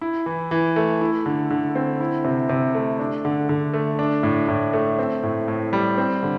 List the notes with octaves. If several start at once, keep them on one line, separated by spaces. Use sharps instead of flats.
E4
E3
E3
A3
E4
D3
D3
C4
E4
C3
C3
A3
D4
D3
D3
A3
D4
A2
A2
A3
C4
A2
A2
G3
C4
D3